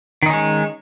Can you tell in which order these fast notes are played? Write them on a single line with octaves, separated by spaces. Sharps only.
D#3 D#4 C#4 G#3